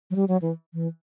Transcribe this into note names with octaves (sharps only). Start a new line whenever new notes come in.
F#3
G3
F#3
E3
E3